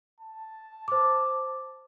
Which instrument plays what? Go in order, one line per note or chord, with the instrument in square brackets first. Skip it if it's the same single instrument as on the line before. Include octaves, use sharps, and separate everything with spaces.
[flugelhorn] A5
[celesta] C5 D6